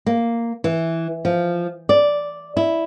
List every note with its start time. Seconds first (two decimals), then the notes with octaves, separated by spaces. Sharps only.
0.06 A#3
0.64 E3
1.25 F3
1.89 D5
2.57 E4